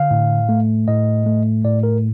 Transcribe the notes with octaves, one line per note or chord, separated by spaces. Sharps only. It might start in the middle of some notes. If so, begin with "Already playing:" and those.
Already playing: D3 F5
A2
A3
A2 D#5
A3
A2 D5
A#4